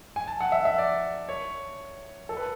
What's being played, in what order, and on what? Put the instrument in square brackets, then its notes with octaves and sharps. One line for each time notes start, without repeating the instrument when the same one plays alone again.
[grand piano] G#5
A5
F#5
E5
E5
D5
C#5
A4
B4